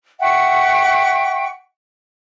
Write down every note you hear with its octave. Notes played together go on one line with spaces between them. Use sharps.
E5 F#5 G5 C#6